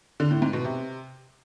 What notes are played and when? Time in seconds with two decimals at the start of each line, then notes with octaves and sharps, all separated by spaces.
0.20 D3
0.31 A2
0.42 G#2
0.53 B2
0.64 C3